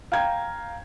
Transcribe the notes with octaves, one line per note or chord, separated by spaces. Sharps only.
F5 G5 A#5 G#6